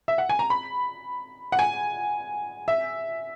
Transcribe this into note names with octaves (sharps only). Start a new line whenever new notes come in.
E5
F#5
G#5
A#5
B5
F#5
G#5
E5